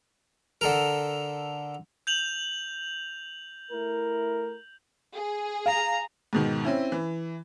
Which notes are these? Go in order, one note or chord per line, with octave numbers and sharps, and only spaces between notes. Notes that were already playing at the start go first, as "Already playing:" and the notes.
D3 A4 A#4
G6 F7 F#7
A3 E4 A#4
G#4
F5 A#5
G#2 B2 D#3
C4 C#4 E4
E3